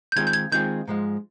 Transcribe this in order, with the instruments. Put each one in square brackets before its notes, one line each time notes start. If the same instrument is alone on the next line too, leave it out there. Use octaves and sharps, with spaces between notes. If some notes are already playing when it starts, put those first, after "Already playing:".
[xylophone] G6
[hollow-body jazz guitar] D#3 G#3 C4 F4 G#4 [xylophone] G#6
[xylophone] G6
G#6
[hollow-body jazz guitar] D#3 G#3 C4 F4 G#4 [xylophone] G6
[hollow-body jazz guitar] G#2 F3 G#3